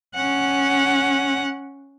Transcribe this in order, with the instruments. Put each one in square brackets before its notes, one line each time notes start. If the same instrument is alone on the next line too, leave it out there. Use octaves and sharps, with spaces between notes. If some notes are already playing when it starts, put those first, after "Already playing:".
[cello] C#4 F#5